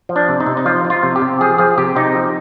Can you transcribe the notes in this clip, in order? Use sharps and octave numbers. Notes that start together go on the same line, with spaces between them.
F3
D4
C3
D#4
C3
D#4
F3 F4
F3
F4
C3
G4
C3
F3 G#4
F3 G#4
C3 G4
C3 D#4
F3